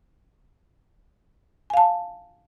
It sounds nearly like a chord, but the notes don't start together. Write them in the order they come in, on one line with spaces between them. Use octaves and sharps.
G#5 F5 A5